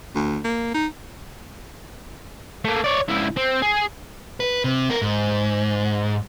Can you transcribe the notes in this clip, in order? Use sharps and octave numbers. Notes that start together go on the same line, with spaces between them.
D2
A#3
D#4
A3 A#3
C#5 D5
C#2 E4
C4
G#4
B4
C3
B3 A#4
G#2